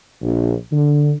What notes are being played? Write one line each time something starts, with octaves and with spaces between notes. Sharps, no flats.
A#1
D3